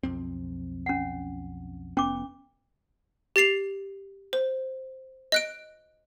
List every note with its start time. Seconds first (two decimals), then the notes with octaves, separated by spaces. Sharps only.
0.03 B1 F2 C4
0.86 C#4 F#5
1.97 F1 B3 C#4 D6
3.36 G4 A6 C7 F7
4.33 C5
5.32 D#5 F#6 D7